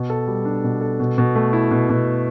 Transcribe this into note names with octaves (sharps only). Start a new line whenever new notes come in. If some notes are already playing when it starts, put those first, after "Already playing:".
Already playing: B2
A4
G3
D4
B2
A4
B2
B2
A3
E4
B2
B2